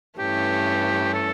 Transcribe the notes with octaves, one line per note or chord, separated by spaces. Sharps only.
G2 E3 A3 C#4 G4
A4